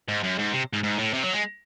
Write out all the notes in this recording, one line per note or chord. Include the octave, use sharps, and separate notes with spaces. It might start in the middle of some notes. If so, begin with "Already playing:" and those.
G#2
F#2
G#2
C3
G#2
G#2
A2
C3
F#3
G#3